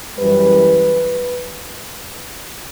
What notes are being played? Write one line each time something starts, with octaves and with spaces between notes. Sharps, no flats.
F#2 E3 G3 B4